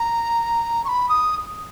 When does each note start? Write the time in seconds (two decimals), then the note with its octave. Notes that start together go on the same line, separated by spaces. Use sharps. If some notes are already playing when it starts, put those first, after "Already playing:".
Already playing: A#5
0.85 C#6
0.88 B5
1.09 D#6